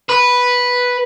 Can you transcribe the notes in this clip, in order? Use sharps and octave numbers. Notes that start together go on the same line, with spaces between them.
B4